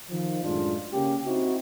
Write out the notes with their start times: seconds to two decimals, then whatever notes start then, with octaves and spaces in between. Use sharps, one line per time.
0.10 D#3 F3
0.43 F#2 A2 G#3 D4 F4
0.93 C#3 A#3 C#4 G4
1.25 C4 D#4 E4 F#4